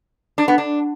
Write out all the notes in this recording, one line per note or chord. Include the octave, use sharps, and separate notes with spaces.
D4
B3
D4